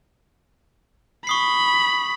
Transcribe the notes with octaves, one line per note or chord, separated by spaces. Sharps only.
B5 C#6 D#6 C7